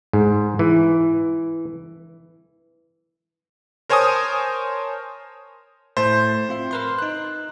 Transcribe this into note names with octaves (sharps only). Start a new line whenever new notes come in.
G#2
E3
A#4 C5 C#5 G#5 A5 D#6
A2 A3 C5
C4 F4 E5
A#4 B4 C6
D#4 F#6